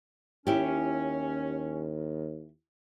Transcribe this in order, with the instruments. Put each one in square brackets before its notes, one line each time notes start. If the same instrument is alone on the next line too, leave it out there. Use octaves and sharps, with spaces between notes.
[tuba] D#2 [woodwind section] C#4 [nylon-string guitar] E4 G4